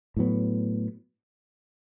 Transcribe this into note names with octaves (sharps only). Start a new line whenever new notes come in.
A2 F#3 B3